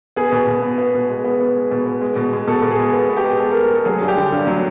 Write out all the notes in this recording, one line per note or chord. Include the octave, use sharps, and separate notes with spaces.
B3 G#4
B2
B2
B3
B3
B2
G#3
B3
B3
G#3
B2
B3
G#3
B2
G#3
B2 A4
B2
G#4
G#3
B3
B3
G4
G#3
B3 A4
A#4
G#3
A#4
G#3 A4
F#3 G#4
G2
G4
D3
G2
F#3